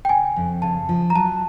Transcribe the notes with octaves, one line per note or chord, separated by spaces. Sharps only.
G5
C#3 G#5
F2
C#3 A5
F3
A#5
F#3 A5